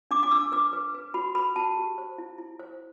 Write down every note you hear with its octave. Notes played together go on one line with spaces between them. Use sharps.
D4 D6
D6
D4 E6
B4 D6
B4
B4
F#4 B5
B4 B5
F#4 A5
G4
C5
E4
E4
C5